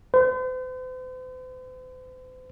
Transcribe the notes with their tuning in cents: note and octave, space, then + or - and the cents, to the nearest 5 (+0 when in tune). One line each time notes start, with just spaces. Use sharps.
C5 -45